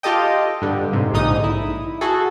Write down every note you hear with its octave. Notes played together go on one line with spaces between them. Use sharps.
F4 G4 A4 D#5 G5
G2 D3 G3
G#2 C3
A#1 G#2 D3 D#4 D#6
E4
F#4 G#4 A4